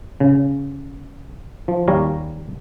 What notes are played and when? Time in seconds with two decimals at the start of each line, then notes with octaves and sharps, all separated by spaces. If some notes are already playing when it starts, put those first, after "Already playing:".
0.20 C#3
1.68 F3
1.88 D#2 G3 C#5 F5 G#5 A#5